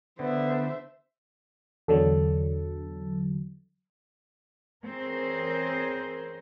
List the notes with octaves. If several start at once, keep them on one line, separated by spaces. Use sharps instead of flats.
D3 B3 C5 E5
E2 D3 F#3 A4
E3 C4 G#4 A#4 C5 C#5